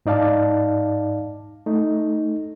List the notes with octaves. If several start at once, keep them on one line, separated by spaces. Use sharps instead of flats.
G#2 D#4 D5 F5 A5
A3 D#4